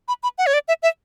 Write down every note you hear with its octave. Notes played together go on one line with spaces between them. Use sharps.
B5
B5
F#5
C#5
D5
E5
E5